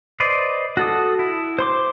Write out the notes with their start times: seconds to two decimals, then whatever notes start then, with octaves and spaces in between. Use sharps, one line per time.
0.20 B4 C5 D5 D#5
0.77 F#4 A4 D#6
1.19 E4
1.59 C5 C6 D6